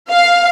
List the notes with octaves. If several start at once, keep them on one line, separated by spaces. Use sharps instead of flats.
F5